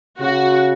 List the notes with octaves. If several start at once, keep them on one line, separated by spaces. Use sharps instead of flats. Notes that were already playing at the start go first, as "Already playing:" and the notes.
C#3 F#4